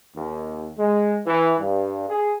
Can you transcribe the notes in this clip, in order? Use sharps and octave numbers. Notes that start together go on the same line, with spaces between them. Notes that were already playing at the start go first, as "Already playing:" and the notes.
D#2
G#3
E3
G2
G#4